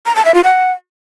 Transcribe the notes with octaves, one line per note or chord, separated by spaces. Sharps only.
A#5
A5
E5
F4
F#5